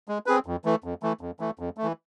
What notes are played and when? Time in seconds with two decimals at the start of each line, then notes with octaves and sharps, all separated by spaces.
0.08 G#3
0.26 C4 G#4 B4
0.46 F2
0.65 E3 A3
0.84 F2
1.03 E3 A3
1.21 F2
1.40 E3 A3
1.59 F2
1.77 A3
1.83 E3